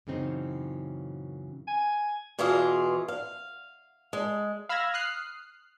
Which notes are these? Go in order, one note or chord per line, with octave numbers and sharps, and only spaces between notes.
F#2 A#2 C#3 E3 C4 D#4
G#5
E2 B2 E3 F4 G#4 F5
F5
G#3
F5 B5 E6 F6 G#6 A#6
D#6 F6 F#6 C7